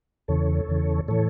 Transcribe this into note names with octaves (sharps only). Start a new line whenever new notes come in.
E2 C#3 E3 A4 C#5
E2 C#3 E3
A2 E3 A4 C#5